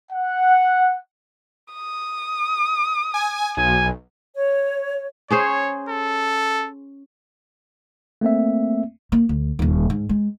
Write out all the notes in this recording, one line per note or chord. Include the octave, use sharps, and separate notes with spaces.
F#5
D#6
G#5
B1 G#5
C#5
C#4 G#4 C5 C#5
A4
A3 A#3 C4 E5
A#3
D2
D#1 D#2
G#2
G#3